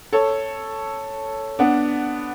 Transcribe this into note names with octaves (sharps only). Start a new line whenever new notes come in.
A4 C#5
B3 D4